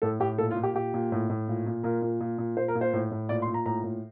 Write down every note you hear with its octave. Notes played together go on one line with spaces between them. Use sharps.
A2 A4
A2 G4
A#2 A4
F4
A#2
G4
A#2 G4
A#2
A2
A2
A#2
A#2
A#2 A#4
A#2
A#2
A#2
A#2 C5
A#4
A#2
C5
A2
A2
A#2 D5
C6
A#2
A#5
A2 A#5
A2